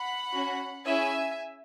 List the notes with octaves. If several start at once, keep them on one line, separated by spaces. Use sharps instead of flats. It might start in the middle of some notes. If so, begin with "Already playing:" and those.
Already playing: F#5 B5
C#4 F#4
C#4 E4 G#4 E5 G#5